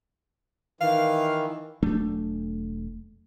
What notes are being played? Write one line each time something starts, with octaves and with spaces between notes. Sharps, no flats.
D#3 E3 F5
E1 F#3 A3 D4